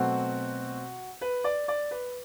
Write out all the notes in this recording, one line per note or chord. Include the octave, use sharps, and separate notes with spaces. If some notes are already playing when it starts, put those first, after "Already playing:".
Already playing: B2 F#3 A3 C4 F#4
B4
D5
D5
B4